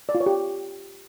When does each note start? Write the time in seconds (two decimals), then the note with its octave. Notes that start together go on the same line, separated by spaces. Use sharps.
0.09 D5
0.15 F4
0.20 C#5
0.26 G4